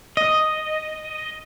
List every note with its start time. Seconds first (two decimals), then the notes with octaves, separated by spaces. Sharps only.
0.17 D#5